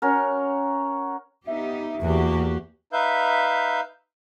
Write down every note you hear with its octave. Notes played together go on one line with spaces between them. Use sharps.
C#4 F#4 A#4
B3 D#4 G4 E5
E2 A#3 F#4 G4
D#4 B4 E5 F5 G6